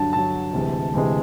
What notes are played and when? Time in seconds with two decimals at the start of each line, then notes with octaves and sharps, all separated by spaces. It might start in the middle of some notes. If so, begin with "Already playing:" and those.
Already playing: G2 D3 F#3 A5
0.13 G2 D3 F#3 A5
0.53 D2 C3 E3 G#3
0.93 D2 C3 E3 G#3